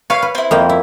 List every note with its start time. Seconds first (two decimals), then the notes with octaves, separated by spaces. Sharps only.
0.10 B4 C#5 F5
0.22 B4
0.35 C4 E4
0.51 F2 A#3 G5
0.69 E4